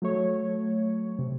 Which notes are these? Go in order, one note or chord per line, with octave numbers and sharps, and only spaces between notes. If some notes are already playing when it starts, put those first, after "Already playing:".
F#3 A3 C#5
C3